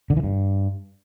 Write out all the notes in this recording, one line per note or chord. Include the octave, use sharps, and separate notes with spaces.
D3
E3
G2